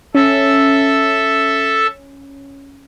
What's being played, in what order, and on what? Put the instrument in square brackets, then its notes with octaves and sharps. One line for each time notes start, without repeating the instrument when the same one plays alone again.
[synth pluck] C#4 [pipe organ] A4 E5